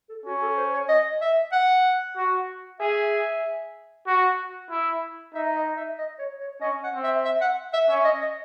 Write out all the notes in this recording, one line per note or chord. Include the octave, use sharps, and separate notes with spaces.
A4
C#4 F#4
A4
C5
C#5
D#5
E5
F#5
F#4
G#4 E5
F#4
E4
D#4 E5
D#5
E5
D#5
C#5
C#5
C#4 D#5
F#5
C4
E5
E5
F#5
E5
C#4 E5
D#5
D#5